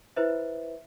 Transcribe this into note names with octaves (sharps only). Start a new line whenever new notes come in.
E4 B4 C5 E5